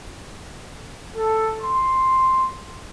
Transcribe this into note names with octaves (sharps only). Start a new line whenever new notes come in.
A4
C6